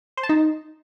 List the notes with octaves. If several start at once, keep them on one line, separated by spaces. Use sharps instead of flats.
C5
A5
D#4